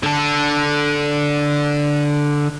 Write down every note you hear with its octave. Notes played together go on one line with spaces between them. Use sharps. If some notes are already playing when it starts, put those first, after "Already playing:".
D3 A4